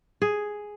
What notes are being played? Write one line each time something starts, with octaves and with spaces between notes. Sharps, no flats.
G#4